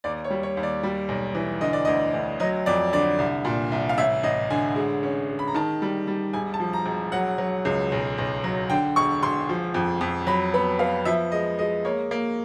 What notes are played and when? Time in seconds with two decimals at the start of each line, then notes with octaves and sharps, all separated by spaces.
0.04 D#2 D5
0.24 C#5
0.30 G3
0.43 C#5
0.57 D#2
0.63 D5
0.83 G3
1.09 B1
1.35 E3
1.61 D3 D#5
1.73 D5
1.85 D2 D#5
2.14 D2
2.40 F#3 D#5
2.66 F2 D5
2.93 D3 D5
3.19 C2
3.45 A#2
3.72 C2
3.89 F5
3.98 A1 E5
4.23 A1 D#5
4.50 D3 G#5
4.76 G#3
5.03 C#4
5.29 G#3
5.39 B5
5.47 A#5
5.54 D#3 A5
5.82 G3
6.07 G3
6.33 E1 G#5
6.54 A5
6.60 F3
6.73 A#5
6.86 E1
7.12 F#3 F#5
7.38 F#3
7.65 C#2
7.92 B1
8.18 B1
8.44 F#3
8.70 D3 G5
8.96 E1 C#6
9.23 E1 C6
9.49 F3
9.74 F2
10.01 F2
10.27 F#3 B5
10.54 B3 B5
10.79 B3 F5
11.05 F3 E5
11.32 G#3 D#5
11.59 G#3 D#5
11.85 A#3 C#5
12.11 A#3